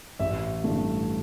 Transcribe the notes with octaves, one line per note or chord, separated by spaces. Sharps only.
A1 E5
G2 D3 A3 E4